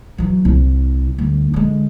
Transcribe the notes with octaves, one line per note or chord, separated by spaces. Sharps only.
E3 F#3
C2
D2 G3
D3 G#3